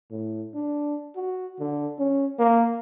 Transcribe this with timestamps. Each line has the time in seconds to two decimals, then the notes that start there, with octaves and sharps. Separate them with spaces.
0.11 A2
0.54 D4
1.16 F#4
1.60 D3
1.99 C#4
2.39 A#3